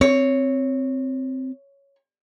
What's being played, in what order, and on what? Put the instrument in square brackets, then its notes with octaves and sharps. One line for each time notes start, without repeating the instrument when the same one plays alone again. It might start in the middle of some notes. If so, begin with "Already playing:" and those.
[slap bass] C4 [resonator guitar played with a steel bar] C#5